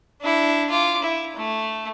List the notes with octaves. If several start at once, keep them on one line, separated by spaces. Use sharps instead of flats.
D4 E4
F4 D6
E4
A3